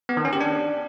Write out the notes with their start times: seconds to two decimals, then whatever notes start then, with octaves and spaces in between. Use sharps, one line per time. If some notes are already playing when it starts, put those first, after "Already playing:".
0.09 B3
0.17 D#3
0.25 C#4
0.33 G4
0.41 D4